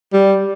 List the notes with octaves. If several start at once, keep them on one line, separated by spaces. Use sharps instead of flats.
G3